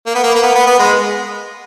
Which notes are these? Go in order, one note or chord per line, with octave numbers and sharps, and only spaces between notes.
A#3
B3
A#3
A#3
B3
B3
B3
G#3